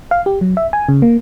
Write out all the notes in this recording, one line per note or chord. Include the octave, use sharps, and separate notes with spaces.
F5
G4
F#3
E5
G#5
C#3
A#3